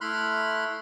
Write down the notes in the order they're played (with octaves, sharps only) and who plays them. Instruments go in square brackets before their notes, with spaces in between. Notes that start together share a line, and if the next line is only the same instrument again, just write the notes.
[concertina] A3 E4 B5 C6 F6 F#6